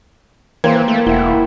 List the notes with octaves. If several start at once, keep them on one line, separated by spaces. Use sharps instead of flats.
E3 A#3 C5 G5 G#6
A3
E1 E4 F#5 G5